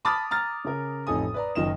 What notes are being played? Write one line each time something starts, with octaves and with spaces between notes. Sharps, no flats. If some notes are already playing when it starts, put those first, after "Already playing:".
A5 B5 D6 D#6 F6 A6
A#5 F6 A6
C#3 A#4
A1 F2 D#4 A4 G#5 D#6
B4 D5 A#5
F#1 F#2 D#3 D#5 E7